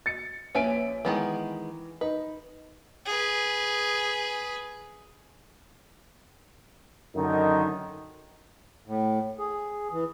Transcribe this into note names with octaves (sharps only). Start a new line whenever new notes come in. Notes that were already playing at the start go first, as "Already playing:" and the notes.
A6 C#7
A#1 C#4 B4 E5 G#5 D7
D#3 E3 G#3 B3
D#4 B4
G#4 B4
F#2 D3 D#3 D#4
A2
G#4
E3